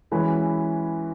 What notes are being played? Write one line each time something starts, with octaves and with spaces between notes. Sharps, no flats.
E3 G#3 C#4 F#4 B4